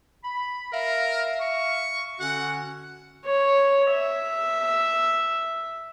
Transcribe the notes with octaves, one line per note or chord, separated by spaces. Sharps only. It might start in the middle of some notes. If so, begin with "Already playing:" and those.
B5
A#4 E5 F5
C#6
D3 C#4 F#4 F#5
C#5
E5